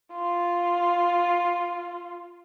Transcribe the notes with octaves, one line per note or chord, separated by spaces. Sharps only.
F4